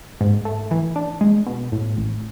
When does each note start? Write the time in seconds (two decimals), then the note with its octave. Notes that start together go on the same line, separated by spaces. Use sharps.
0.21 G#2
0.45 A3
0.71 E3
0.96 D4
1.21 G#3
1.46 B2
1.72 A2
1.97 A1